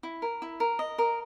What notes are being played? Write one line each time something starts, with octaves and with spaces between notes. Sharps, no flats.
E4
A#4
E4
A#4
D#5
A#4